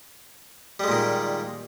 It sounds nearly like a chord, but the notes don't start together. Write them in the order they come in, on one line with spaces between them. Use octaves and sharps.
G3 G#3 A#2 D#3